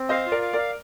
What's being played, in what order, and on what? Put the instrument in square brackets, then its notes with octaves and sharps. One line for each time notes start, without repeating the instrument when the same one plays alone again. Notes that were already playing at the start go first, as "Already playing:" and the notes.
Already playing: [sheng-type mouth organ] C4
[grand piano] C5 D#5 [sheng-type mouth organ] F5
[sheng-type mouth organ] F4
[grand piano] A#4 D5
[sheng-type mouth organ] F5
[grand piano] A#4 D5 [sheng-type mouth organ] F5